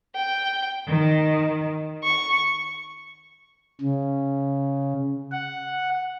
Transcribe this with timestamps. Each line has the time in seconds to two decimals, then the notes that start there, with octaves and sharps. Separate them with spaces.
0.16 G5
0.87 D#3
2.03 C#6
3.81 C#3
5.31 F#5